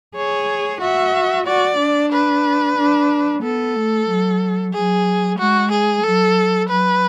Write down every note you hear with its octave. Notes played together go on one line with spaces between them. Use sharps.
G#4 C#5
F#4 E5
F#4 D5
D4
B4
D4
B3 A4
A3
F#3
F#3 G#4
G#3 F#4
G#4
F#3 A4
F#3 B4